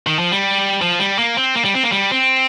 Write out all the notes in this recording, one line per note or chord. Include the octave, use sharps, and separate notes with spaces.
D#3
F3
G3
F3
G3
A#3
C4
A#3
G3
C4
A#3
G3
C4